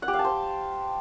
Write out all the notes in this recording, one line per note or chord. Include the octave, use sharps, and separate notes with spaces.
F#5
G4
F5
A5
C5